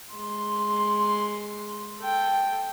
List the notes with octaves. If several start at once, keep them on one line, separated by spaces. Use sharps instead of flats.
G#3 C6
A4 G5